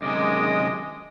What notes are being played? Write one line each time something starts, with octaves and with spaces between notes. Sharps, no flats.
F#2 C3 D#3 G#3 D#5 D6